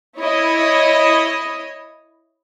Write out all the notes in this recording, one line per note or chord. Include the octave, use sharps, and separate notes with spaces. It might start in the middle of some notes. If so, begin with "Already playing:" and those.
E4 C#5 D#5